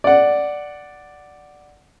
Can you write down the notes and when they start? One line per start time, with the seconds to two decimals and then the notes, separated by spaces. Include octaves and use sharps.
0.04 D5 F#5